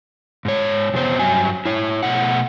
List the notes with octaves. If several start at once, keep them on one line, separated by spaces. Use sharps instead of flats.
G#2 C#5
F2 C3 B3 C5
G2 F#3 G#5
E4 C#5
B2 A3 F#5